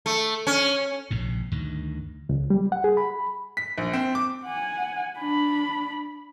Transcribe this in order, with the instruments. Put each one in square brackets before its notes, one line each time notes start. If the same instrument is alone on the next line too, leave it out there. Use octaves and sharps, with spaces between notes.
[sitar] A3
C#4
[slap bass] A#1 G#2 C3
D2 G2 D#3
[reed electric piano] C#2
G3
F#5
G#4
B5
[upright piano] B6
A#1
C4
D6
[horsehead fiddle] F#5 G#5
D4 B5